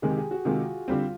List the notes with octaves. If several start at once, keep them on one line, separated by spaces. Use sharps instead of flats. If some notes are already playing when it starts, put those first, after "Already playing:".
C3 D#3 G#3 G#4
G4
G#4
F#4
C3 D#3 G#3 F4
D3 G3 C4 F4